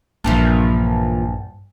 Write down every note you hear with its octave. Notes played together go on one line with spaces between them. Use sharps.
A#1 G2 A#2 E3 F3 A5